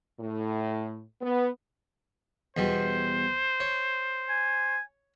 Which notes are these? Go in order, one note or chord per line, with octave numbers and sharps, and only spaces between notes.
A2
B3
E2 B2 G3 C5
C#5
G#5